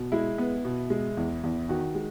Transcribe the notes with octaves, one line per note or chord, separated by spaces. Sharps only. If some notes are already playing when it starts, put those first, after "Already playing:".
Already playing: B2
G#3 E4
B3
B2
G#3
E2
E2
D#3 F#4
G#3